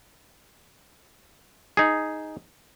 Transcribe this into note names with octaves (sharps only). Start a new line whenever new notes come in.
D#4 G#4